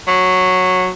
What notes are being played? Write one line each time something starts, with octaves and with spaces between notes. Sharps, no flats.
F#3